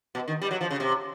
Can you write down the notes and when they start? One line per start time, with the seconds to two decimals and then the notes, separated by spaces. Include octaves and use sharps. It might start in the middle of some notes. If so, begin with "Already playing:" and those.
0.15 B2
0.28 D#3
0.42 G3
0.51 F#3
0.61 F3
0.71 C#3
0.80 C3